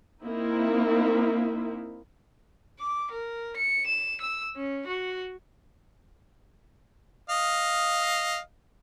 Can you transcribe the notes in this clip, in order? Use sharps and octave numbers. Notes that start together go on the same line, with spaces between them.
A#3 C4 D#4 E4
D6
A#4
C#7
E7
E6
C#4
F#4
D#5 F5